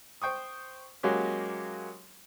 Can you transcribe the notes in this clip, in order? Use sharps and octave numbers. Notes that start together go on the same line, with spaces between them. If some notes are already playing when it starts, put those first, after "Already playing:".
C5 G5 C#6 D#6
F#3 G#3 A#3 C#4 F#4 G4